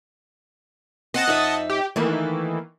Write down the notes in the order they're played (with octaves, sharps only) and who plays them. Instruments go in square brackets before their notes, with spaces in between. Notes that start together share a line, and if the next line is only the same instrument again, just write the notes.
[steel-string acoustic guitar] C4 [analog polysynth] D#5 F#5 A5
[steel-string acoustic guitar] F2 D#4 E5
[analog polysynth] G4
[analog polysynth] D#3 E3 [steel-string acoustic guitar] A3 A#3 A4